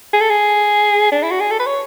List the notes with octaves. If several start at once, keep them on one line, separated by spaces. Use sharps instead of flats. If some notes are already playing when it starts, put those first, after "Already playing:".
G#4
A4
G#4
D4
E4
F#4
G#4
A4
B4
C#5